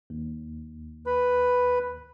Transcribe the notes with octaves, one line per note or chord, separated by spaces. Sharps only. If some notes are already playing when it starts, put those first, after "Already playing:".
D#2
B4 B5